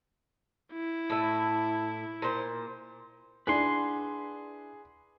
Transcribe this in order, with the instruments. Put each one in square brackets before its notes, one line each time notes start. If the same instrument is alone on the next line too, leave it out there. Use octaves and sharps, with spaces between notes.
[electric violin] E4
[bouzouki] A2 E5
A#2 C5
[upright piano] D4 E4 [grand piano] G#4 [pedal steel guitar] B4 F#5 C6